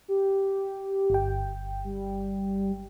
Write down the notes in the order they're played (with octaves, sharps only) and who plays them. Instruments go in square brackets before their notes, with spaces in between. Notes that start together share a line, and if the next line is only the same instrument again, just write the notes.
[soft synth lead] G4
[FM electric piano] G1 G5
[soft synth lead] G3